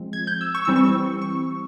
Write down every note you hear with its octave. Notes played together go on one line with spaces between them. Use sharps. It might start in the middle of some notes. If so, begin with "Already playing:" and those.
Already playing: F3 G#3 C4
G#6
G6
E6
C#6
E3 G3 C4 E6
C#6
C#6